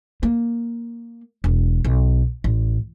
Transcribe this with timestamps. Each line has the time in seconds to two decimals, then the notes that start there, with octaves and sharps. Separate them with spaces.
0.23 A#3
1.44 E1
1.85 B1
2.44 A1